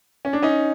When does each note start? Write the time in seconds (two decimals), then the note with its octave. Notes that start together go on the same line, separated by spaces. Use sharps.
0.25 C#4
0.33 D4
0.42 C#4 D#4